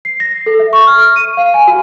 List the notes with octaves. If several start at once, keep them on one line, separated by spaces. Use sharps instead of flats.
C7
A#6
A4
E5
C#6
F6
D#7
F5
G#5
F#4